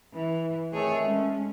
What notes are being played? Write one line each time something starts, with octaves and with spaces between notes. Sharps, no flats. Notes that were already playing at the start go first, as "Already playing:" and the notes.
E3
C3 D#3 A3 G#4 C#5
G#3 C#4